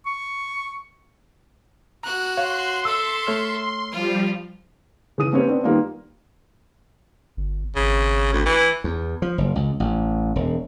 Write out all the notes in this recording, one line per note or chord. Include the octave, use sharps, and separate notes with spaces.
C#6
F#4 A#5 F#6
C#5 F5 C6
A4 E5 E6
A3 C#5 F6
F3 G3 F4
C#3 E3 D#6 D#7
A#3 C4 C#4 G4 B4 C#5
B3 C4 D4
D#3 G3 A#3 B3 D#4 F4
G1
G#1 C#3
D2
E3
E2
F3
F#1
C#2
A1
E1